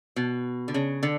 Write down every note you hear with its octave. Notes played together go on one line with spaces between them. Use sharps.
B2
D3
C#3
D3